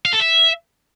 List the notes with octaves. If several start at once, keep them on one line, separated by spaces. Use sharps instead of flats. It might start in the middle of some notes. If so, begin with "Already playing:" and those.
F5
A4
E5